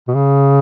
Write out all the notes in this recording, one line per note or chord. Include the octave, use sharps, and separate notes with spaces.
B2
C#3